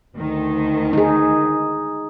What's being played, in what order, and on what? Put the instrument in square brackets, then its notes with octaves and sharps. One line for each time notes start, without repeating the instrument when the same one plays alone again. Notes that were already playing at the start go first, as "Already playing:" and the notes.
[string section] D2 D#3
[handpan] D#4 G#4